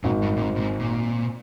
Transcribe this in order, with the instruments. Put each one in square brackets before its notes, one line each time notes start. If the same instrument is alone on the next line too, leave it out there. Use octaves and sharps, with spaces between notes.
[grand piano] G#1 [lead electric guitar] A#2
[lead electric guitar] G2
A#2
[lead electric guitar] G#2 [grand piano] C4
[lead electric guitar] A#2
G#2
A#2